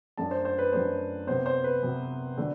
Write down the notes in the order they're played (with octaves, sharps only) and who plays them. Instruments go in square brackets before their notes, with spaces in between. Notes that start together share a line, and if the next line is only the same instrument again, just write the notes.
[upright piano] F#2 F#3 A3 D4 A5
C5
C5
B4
F#2 F#3 A3 D4 C5
C3 F#3 B3 C5
C5
B4
C3 F#3 B3
D3 F#3 A3